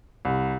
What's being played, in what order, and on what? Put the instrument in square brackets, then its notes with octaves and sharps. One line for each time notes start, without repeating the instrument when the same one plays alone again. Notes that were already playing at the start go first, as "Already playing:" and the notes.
[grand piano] C2